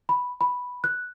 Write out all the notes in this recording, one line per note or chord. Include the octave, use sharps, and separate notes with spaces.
B5
B5
F#6